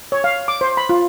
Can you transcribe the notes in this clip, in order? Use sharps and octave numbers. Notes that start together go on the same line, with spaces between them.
C#5
F5
D6
C5
B5
F4